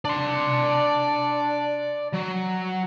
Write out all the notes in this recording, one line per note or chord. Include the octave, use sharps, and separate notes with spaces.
D4 D5 C6
F#3